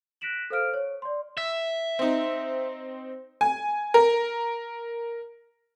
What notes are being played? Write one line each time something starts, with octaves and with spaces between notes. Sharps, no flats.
F#6 A#6 B6 D7 E7 F#7
A4 C5 F5 F6 D7
C#5
D5 C6
E5
C4 D#4
G#5
A#4